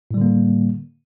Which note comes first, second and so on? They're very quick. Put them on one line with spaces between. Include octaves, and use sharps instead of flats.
A2 G3 D3 A#3